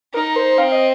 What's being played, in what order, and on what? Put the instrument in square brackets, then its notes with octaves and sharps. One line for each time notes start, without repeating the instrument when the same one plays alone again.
[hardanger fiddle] D#4 [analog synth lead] A#4
[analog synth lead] C5
[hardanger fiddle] C4 [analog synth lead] F5
[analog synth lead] D#5